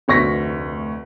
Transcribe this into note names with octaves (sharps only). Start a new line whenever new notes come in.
F1 D2 C#6 A#6 B6